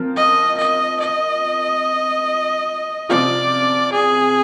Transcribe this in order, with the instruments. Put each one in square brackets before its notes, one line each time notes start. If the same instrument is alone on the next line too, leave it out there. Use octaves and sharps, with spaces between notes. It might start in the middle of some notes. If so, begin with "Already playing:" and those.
Already playing: [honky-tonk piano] F3 C4 F4 A#4
[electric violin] D#5
D#5
D#5
[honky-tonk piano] C3 F3 C4 F4 [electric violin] D5
[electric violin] G#4